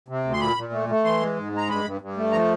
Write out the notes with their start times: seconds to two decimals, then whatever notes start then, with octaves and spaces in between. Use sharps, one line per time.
0.08 C3
0.24 D2
0.34 C6
0.40 A#2 B5
0.56 A#2
0.72 A3
0.89 A3
1.04 E3 C6
1.20 G#3
1.37 G#2
1.52 G#3
1.57 A#5
1.69 G2 B5
1.84 G2
2.01 G2
2.17 A3
2.32 F3 A#5